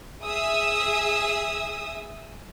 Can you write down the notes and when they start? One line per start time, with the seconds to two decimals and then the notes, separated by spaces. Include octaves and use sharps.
0.23 G#4 E5 D#6 E6